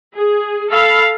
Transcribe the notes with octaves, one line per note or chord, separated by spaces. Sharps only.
G#4
A4 F5 B5